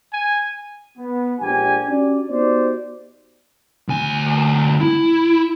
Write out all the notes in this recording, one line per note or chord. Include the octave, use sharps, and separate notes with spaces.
G#5
B3
A#1 F3 G#3 D4 G4 G#5
C#4 D4 F#4 G4 D5
B3 D#4 F#4 G4 C5 D5
D2 G#5
E4